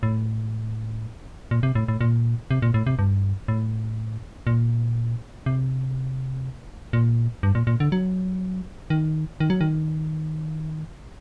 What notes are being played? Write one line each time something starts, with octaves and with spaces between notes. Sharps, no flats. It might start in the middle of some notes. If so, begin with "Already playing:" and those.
A2
A#2
C3
A2
A2
A#2
C3
A#2
A2
C3
G2
A2
A#2
C3
A#2
G2
A#2
A#2
D3
F#3
D#3
D#3
F#3
D#3